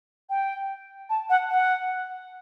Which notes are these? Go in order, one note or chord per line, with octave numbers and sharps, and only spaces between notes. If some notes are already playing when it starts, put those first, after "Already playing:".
G5
A5
F#5
F#5